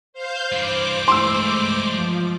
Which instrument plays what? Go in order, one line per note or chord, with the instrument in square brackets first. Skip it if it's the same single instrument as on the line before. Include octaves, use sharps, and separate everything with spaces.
[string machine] C5 F5 G6
[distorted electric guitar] G2 E3 [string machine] C5 D6
[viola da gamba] G#3 A3 [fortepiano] C6 E6
[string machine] F3